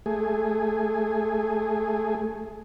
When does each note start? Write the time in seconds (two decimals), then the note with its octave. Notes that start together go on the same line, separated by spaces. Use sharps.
0.06 A3 G#4